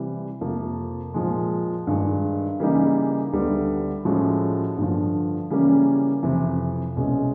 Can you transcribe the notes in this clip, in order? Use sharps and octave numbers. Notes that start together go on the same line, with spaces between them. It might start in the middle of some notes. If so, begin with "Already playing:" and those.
Already playing: C3 E3 G3
F2 C3 F3 A#3
A#2 F3 G#3
G2 D#3 G#3
C#3 E3 G3 A#3 D#4
D2 D3 G3 B3
A2 F3 G#3 C#4 F#4
G2 D3 F3
C#3 E3 G3 A#3 C#4
F2 C3 E3
C2 B2 G#3 C#4